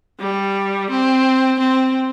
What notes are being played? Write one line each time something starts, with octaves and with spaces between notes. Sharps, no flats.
G3
C4
C4